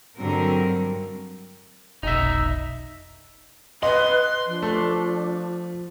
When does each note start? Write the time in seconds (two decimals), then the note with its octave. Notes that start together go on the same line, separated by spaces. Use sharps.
0.17 G2 D3 F#3 G3 C4 A#4
2.03 F1 B1 D#4 E5
3.83 B4 D#5 C6
4.47 F3 D4
4.62 A3